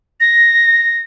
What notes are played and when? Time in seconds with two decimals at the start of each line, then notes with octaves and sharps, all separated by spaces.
0.20 A#6